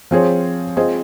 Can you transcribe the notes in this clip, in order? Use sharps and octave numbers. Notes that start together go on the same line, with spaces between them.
F3 C4 F4 G#4 C#5
C4 F4 G#4 C5 D#5